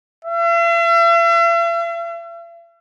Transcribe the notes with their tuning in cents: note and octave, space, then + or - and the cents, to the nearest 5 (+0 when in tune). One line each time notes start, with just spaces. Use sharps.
E5 +45